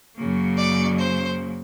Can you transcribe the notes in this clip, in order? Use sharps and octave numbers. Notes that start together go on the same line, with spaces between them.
F#2 C#3 F#3 A#3
D5
C5